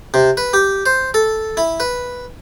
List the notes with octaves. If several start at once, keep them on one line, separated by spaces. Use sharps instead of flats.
C3
B4
G4
C5
A4
E4
B4